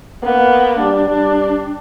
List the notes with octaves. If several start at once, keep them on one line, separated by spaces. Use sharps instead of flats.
A#3 B3
G3 D4
G3 D4